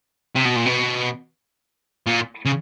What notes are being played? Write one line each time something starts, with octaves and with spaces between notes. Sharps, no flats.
C3
B2
A#2
B2
A#2
C#3